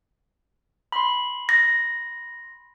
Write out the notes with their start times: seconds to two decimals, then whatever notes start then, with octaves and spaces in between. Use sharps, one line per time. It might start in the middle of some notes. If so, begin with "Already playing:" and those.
0.92 B5 C6
1.49 A#6